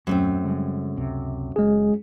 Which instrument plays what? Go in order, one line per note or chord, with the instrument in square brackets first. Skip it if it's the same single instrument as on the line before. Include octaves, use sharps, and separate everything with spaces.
[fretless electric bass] D#1 C#4 [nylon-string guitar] F#2 A3 C4
[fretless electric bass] C#3 G3 G#3
C#2 C3
[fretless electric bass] F#1 [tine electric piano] G#3 G#4